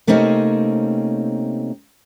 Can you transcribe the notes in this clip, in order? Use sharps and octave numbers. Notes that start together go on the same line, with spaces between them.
C3 A3 A#3 C4 C#4 D#4